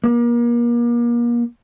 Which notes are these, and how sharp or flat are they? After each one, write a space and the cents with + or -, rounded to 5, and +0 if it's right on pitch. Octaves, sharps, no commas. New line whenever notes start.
A#3 +35